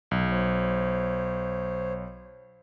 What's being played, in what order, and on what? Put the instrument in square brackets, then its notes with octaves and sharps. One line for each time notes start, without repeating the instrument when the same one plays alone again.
[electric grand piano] B1
[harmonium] C5 C#5